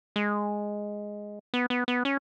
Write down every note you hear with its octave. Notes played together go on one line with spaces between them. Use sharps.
G#3
B3
B3
B3
C#4